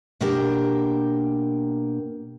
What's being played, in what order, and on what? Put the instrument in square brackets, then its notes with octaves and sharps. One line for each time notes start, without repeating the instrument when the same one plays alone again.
[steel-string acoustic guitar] B2 A#3 D4 G4 A#4